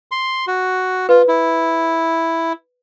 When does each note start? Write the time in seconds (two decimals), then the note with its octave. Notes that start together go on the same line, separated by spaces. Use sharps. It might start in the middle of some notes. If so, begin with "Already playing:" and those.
0.11 C6
0.48 F#4
1.09 F4 B4
1.28 E4